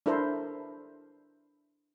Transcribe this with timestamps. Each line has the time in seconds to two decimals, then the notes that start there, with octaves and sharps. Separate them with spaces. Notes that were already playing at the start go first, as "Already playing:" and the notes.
0.06 D4 E4 A4 A#4 C5